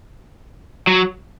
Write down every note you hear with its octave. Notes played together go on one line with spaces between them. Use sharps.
F#3